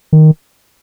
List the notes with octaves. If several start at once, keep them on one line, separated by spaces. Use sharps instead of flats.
D#3